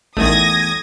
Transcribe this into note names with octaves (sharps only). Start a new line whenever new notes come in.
A1 E2 D#3 A3 D#6 G#6 A#6